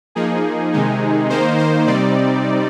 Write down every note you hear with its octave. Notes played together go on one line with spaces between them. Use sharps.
F3 A#3 D#4 G#4
C3 D#3 G#3 D#4
D#3 A#3 D#4 C5
C5
C3 G3 C4 D#4 D5